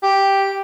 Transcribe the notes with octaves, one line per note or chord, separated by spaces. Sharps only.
G4